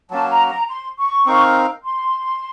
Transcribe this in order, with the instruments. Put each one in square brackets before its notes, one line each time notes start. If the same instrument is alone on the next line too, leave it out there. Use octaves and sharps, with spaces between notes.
[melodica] F#3 A#3 C#4 F#4 [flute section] A5
[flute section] A#5
A#5
C6
C#6
[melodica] C4 D#4 A#4 F5
[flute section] C6